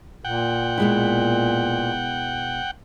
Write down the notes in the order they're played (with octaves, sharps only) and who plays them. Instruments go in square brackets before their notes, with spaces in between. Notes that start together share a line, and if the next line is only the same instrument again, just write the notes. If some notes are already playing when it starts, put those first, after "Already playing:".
[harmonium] A#2 [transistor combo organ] F#5 G5
[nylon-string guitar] B2 G#3 E4